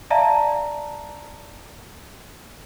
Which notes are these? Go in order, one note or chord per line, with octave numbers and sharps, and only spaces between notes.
D5 E5 F5 A5 A#5